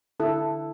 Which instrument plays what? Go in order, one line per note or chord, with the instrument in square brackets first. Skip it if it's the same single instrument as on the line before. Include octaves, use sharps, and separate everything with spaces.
[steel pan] D3 E4 A4